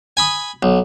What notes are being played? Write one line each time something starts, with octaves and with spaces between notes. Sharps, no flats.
G#5 B5 D#6
B1